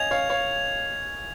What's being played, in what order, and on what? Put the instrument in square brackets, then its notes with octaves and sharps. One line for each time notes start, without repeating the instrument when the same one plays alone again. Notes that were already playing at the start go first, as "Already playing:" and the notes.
Already playing: [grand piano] C#5 D#5 F5 G#5 [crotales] G#6 F7
[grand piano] C#5 F5
C#5 F5